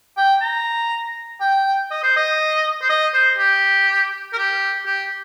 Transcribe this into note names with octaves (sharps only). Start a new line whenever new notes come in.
G5
A#5
G5
D#5
C5
D#5
C5
D#5
C5
G4
A#4
G4
G4